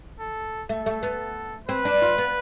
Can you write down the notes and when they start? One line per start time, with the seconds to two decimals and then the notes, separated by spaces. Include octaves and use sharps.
0.20 A4
0.69 A3 A4
0.86 A3
1.03 B3
1.68 C4 B4
1.85 D4
2.02 F4
2.18 B3